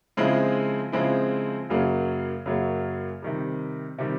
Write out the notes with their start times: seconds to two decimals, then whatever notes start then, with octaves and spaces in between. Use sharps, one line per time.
0.17 C#3 F3 G#3 C4 E4
0.92 C#3 F3 G#3 C4 E4
1.69 F#2 C#3 F#3 A#3
2.46 F#2 C#3 F#3 A#3
3.22 C3 D#3 G3
3.98 C3 D#3 G3